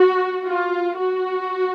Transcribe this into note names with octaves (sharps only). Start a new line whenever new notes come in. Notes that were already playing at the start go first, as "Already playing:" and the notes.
Already playing: F#4
F4
F#4